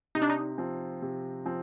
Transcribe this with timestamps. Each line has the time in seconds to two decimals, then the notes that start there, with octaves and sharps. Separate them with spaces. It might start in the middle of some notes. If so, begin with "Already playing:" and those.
0.15 C3 D#4
0.22 D4
0.30 D#4
0.58 F3 C4
1.02 C3
1.46 F3 C4